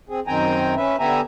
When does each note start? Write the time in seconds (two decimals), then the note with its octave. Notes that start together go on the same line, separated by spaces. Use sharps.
0.09 C4 G#4
0.27 F#2 D#3 C4 G5 G#5 A#5
0.76 C#4 B4 E5
0.99 D3 B3 G4 E5 G#5 A#5